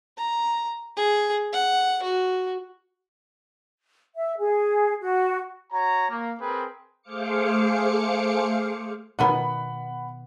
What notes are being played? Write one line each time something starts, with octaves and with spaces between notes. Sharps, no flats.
A#5
G#4
F#5
F#4
E5
G#4
F#4
F#4 C#5 A#5
A#3
C4 G#4 A#4 B4 G5
A3 G#4 C5 F5 D6 C#7
B2 D#3 B3 F#5 B5